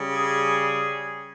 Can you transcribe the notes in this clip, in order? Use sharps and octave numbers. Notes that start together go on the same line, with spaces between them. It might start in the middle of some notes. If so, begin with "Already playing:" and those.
Already playing: C#3 G3
G#4